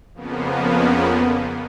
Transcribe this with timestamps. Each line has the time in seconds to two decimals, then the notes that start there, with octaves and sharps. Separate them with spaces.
0.14 F2 C#3 F3 A#3 B3